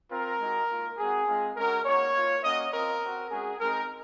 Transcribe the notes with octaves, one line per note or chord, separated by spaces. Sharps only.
C4 F4 A#4
G#3 D#4 F#4
A#3 F4
G#3 C4 F#4 G#4
G#3 C4 F4
G#3 C#4 F#4 A#4
A#3 D#4 F#4 C#5
A#3 F4
A#3 C#4 F#4 D#5
C4 F4 A#4
C4 F#4
G#3 C#4 F#4 G#4
G#3 C4 D#4 A#4